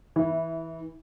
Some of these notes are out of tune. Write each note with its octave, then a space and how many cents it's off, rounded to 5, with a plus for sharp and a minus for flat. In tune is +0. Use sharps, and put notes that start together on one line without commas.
E3 -20 E4 -5